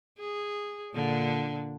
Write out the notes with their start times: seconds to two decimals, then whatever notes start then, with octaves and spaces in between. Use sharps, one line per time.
0.19 G#4
0.94 A#2 D3 D4